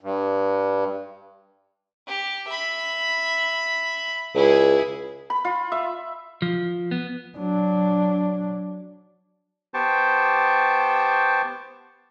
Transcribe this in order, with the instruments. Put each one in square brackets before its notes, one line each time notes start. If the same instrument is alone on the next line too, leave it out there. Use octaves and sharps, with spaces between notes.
[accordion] G2
[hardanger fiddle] G4
E5 B5
[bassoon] C#2 [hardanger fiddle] E4 G#4
[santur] B5
F4
E5
[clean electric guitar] F3
B3
[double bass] F#3 D4
[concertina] B3 G4 C5 G5 A5 C#6